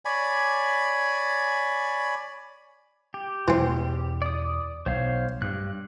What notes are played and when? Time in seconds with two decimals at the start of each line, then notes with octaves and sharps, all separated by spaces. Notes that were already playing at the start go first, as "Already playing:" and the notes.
0.05 C#5 D5 G#5 B5
3.14 G4
3.48 E2 B2 E3 C4
4.22 D5 D#6
4.86 B1 C5 C#5 F5
5.42 G2 F#6